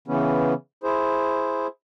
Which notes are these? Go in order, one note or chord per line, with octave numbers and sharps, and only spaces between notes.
C#3 E3 B3 C#4
E4 G#4 C5